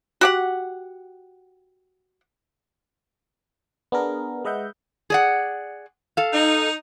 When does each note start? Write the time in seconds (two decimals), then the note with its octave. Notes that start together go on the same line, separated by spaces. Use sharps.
0.21 F#4 G4 F#5
3.92 B3 D4 G#4 A#4
4.45 G#3 B4 D#5 E5 F#5 G6
5.10 G#4 D5 F#5
6.17 A4 F5
6.33 D#4